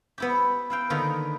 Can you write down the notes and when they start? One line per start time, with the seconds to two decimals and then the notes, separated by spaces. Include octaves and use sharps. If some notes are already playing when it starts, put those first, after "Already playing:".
0.18 B3 E4 G4
0.70 E4 F5 G5
0.90 D3 D#3 A#3 B3 F4